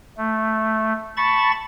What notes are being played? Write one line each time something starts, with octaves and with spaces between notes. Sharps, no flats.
A3
A5 B5 C#6 A6